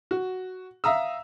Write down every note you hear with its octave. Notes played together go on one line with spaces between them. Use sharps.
F#4
E5 F5 A#5 D#6 E6